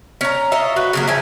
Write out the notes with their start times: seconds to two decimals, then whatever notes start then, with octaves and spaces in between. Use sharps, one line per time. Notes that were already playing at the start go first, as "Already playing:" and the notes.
0.21 C#4 A#5
0.52 F4 C#5 D#5 E5
0.76 F#4 B4
0.93 C#3 F#3 A#3
1.07 F3 E5 G#5